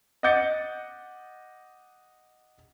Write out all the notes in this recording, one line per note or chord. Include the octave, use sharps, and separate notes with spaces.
D#5 F#5 D6 G6 A6 C#7